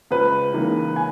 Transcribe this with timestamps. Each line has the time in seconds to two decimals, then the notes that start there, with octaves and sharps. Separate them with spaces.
0.11 C#2 B4
0.54 C#3 E3 A#3 D#4
0.96 G#5